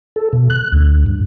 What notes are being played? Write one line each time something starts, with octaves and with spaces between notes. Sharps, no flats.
A4
B2
F#6
D2
G2